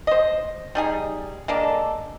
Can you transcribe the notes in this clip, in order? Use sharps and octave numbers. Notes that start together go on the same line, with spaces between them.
C5 D#5
G3 D#4 G#4
G#3 A#3 D4 A4